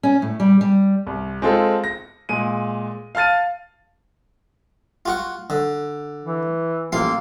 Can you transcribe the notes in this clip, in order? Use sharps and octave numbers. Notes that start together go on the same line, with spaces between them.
C#4
A2
G3
G3
C2
G#3 C4 F4 A4
A#6
A#2 G#3 D#7
F5 A5 F6 A6 D#7
F4 F#4 F#5
D3
E3
A1 A#3 F4 C6